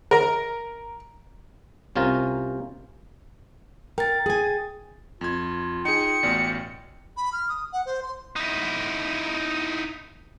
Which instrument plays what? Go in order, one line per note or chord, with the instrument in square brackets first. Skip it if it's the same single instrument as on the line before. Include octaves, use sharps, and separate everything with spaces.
[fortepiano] A#4 A#5
[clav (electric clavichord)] C2 C3 C#4 F4 A#4
[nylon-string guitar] A#4 [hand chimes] G5 A6
[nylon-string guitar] G#4 G#5
[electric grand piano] F2 G#6 [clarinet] F4
[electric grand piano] D#4 G#4 [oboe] G5 [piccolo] C#7
[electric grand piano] A1 B2 D5
[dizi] B5
F6
D#6
F#5
C5
C6
[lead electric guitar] D#4 E4